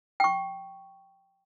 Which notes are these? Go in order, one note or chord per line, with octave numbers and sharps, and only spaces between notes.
G5 C#6